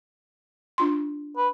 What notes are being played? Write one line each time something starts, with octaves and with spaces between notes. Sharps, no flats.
D4 F4 C6
B4